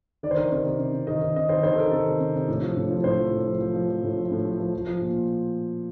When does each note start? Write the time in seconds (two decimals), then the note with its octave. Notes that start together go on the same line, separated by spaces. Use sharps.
0.23 D#3 D5
0.31 C5
0.37 D#3 A#4
0.52 C3 A#4
0.65 C3
0.79 C3
0.93 C3
1.07 D#3 D#5
1.22 D#3
1.36 C3 D#5
1.49 D#3 C5
1.63 D#3 C5
1.74 A4
1.78 D#3 A#4
1.91 C3 A4
2.06 D#3
2.20 C3
2.35 C3
2.48 A2
2.63 F3
2.77 A2
2.91 F3
3.04 A2 C5
3.19 F3
3.32 A2
3.47 F3
3.61 F3
3.75 F3
3.89 F3
4.03 A2
4.18 F3
4.31 A2
4.45 F3
4.60 F3
4.74 F3
4.87 F3
5.01 A#2